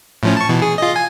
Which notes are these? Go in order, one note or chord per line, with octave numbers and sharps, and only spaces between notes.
A2 F3 C#4
A5 C#6
B2 E3
G#4
F4 D#5
G#5